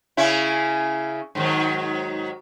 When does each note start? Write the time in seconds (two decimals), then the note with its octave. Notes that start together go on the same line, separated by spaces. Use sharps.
0.17 C#3 C#4 E4
1.35 G#2 D#3 F#3